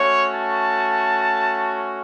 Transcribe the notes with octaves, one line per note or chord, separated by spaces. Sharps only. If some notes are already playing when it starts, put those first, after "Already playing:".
Already playing: A3 C#4 F#4 C#5
A5